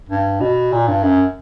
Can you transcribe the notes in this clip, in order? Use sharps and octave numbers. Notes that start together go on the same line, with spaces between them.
G2
B2
A#2
G2
F#2